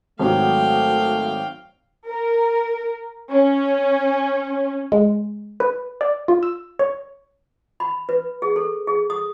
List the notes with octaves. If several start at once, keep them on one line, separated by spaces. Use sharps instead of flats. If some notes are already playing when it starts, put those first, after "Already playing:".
G#1 F#3 A3 F5 G5
A#4
C#4
G#3
B4
D5
F4
E6
C#5
B5
B4
G#4
A4
G#4
D#6